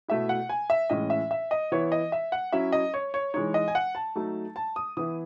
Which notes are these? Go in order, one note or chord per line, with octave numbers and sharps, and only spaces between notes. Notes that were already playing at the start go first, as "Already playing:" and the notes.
B2 A3 E4 E5
F#5
G#5
E5
A2 E3 G#3 C#4 D#5
E5
E5
D#5
E3 B3 E4 C#5
D#5
E5
F#5
F#3 C#4 E4 E5
D#5
C#5
C#5
E3 G#3 D#4 C#5
D#5
G#5
F#5
A5
F#3 A3 D#4
A5
D#6
E3 B3 E4 D#6